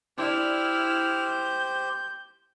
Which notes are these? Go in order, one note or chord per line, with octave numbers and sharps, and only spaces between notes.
D4 E4 G4 C5 D5 F6
G6